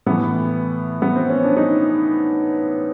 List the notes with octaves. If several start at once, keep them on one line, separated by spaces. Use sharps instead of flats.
A2 E3 B3
B3
C4
C#4
D4
D#4